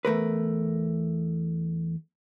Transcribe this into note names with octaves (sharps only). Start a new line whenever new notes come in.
E2 A3 A#4 B4